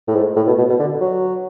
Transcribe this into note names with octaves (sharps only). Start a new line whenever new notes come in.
A2
G#2
A2
B2
B2
B2
D3
F#3